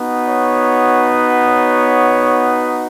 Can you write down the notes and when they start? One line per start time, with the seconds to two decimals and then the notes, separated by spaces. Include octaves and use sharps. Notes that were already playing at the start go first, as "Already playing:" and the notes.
Already playing: B3 D#4 F#4
0.27 C#5
1.47 C#5